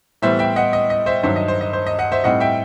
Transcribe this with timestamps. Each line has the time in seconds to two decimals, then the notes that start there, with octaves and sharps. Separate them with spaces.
0.22 A2 E3 G3 B3 C5 E5
0.39 E5 G5
0.56 D#5 F#5
0.73 D#5
0.90 D#5
1.06 C5 E5
1.23 G2 D#3 F#3 C5 E5
1.36 D#5
1.48 C5
1.61 D#5
1.73 C5
1.87 D#5
1.99 D#5 F#5
2.12 C5 E5
2.24 A2 G3 C4 D#4 D#5 F#5
2.40 E5 G5